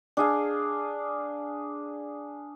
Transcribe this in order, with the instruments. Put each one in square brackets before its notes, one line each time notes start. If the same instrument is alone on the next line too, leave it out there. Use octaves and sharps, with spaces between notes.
[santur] D4 G#4 F5